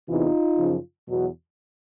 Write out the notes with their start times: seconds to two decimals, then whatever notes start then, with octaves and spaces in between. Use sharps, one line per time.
0.08 E2 C3 E3 D#4 F4
0.58 F#2 C#3 F3
1.08 E2 B2 F#3